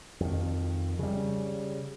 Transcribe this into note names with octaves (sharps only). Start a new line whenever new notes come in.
F2 D#3
C#3 G3